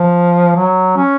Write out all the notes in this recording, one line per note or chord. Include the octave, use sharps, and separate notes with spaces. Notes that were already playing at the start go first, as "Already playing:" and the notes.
Already playing: F3
F#3
C#4